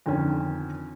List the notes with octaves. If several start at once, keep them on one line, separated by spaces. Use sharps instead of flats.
F2 D3 D#3 C#4